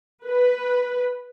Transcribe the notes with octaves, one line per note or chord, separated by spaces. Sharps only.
B4